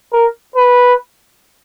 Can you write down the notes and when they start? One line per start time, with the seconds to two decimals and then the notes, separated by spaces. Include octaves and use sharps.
0.13 A#4
0.56 B4